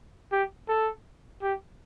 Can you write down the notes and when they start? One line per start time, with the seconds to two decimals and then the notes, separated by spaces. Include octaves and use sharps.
0.32 G4
0.68 A4
1.42 G4